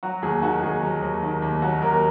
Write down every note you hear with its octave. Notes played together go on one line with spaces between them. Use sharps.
F#3 F#4
D#2 G#4
D#3 F#4
D#2 G#4
F#3
D#2
D#3
D#2
F#3 F#4
D#2 A#4
A#4